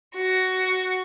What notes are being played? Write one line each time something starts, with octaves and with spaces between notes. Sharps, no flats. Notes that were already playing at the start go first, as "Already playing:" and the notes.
F#4